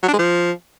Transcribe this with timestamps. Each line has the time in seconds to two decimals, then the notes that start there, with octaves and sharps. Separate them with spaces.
0.03 F#3
0.08 D4
0.13 G#3
0.19 F3